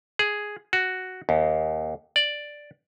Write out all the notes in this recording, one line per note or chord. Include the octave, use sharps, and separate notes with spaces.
G#4
F#4
D#2
D5